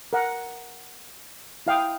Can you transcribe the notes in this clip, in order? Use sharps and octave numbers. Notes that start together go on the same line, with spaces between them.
A#4 F#5
E4 F5 G5 D#6